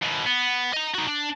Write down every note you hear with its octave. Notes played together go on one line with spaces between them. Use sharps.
D#2 B2
B3
D#5 A#5
D#4 F#4
D4